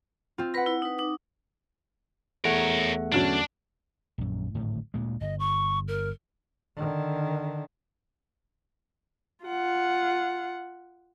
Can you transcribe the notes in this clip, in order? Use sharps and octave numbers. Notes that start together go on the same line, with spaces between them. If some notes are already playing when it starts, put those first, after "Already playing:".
C4 F4
B4 F#5 B5 A#6
E4
D#4 B4
D#4 D6
E2 A3 A#4 C#5 F#5
D3 F#3 C#4 D4
A#1 F#2
D1 G#1 A2
D2 A#2 G#3
G1 D#5
C#6
A#4
D3 D#3
F4 F#5